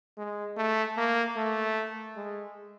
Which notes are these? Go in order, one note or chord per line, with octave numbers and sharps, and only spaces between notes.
G#3
A3
A#3
A3
G#3